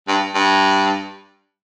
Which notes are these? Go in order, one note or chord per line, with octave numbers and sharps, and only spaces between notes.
G2
G2